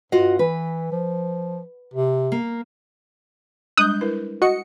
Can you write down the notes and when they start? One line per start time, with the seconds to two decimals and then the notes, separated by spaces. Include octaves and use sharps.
0.12 G2 F4 F#4 D#5
0.39 E3 B4
0.92 F3
1.94 C3
2.32 A#3
3.77 G3 G#3 D4 D#6 F#6 G6
4.01 E4 A#4 B4
4.42 F#4 D#5 C#7